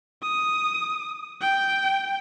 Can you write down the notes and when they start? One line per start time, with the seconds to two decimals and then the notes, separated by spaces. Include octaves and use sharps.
0.22 D#6
1.41 G5